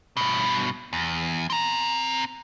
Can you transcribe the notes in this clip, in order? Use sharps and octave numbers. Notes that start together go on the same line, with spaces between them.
G2 B2
E2
C4 A#5